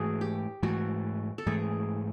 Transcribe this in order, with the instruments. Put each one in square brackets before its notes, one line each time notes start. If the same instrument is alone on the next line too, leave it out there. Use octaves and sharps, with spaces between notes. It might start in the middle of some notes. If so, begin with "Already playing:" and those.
Already playing: [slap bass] G#2 E3 A3 [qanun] F#4 G#4
[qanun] G4
[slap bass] G#2 E3 A3 [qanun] F#4
[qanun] A4
[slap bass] G#2 E3 A3 [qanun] G#4